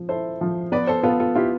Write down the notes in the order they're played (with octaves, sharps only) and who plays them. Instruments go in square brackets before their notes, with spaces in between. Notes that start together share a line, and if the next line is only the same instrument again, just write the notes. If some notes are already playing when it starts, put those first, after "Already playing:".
Already playing: [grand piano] F3
[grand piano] E4 [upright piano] A4 C5
[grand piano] F3
[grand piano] B3 [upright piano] B4 D5
[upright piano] A4 C5
[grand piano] B3 [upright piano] F4 A4
[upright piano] F4 A4
[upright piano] E4 G4 [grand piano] F4